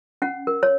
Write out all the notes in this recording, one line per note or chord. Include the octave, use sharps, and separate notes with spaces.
C#4 F#5
A#4
C#5